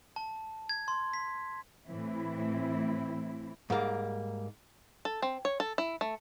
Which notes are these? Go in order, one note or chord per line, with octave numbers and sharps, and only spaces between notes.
A5
G#6
C6
B6
A2 E3 C4 E4
G#2 G3 A#3
A4
C4
C#5
A4
E4
A3